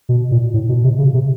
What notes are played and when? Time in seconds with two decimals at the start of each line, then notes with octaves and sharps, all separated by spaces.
0.09 B2
0.31 A#2
0.54 A2
0.69 B2
0.84 C3
0.99 C#3
1.14 C3